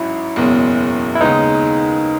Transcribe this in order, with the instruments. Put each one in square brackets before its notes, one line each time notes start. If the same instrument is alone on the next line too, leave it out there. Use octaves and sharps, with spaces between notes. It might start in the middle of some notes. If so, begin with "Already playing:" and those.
Already playing: [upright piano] A1 G#2 F#3 C#4 [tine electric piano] E4
[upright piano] F#1 E2 B2 G#3 C#4
[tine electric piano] E4
[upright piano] D#2 C#3 G#3 B3 [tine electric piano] D#4